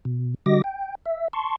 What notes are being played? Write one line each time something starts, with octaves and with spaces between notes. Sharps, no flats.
B2
D3 G3 F#4 D#5 D6 A#6
G5
E5
A5 C6 C#6